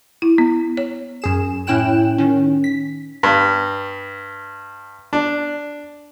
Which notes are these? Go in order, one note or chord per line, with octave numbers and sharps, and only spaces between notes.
E4
B3
C#5
F#2 G#4 E7
A2 C#4 E4 G5 F#6 E7
D#3 C#4
B6
G2
D4